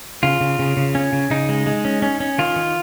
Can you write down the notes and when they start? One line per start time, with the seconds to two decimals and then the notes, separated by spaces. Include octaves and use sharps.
0.23 C#3 F4
0.41 C#3
0.59 C#3
0.77 C#3
0.95 C#4
1.13 C#3
1.31 C#3 D#4
1.49 G#3
1.67 G#3
1.85 C#4
2.02 C#4
2.20 C#4
2.38 D#3 F4
2.56 D#3